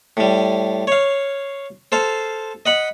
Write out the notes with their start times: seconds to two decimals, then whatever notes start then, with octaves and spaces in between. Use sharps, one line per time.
0.17 A2 G3
0.87 C#5 F5
1.92 A4 C5 F5
2.66 D#5 F#5 B5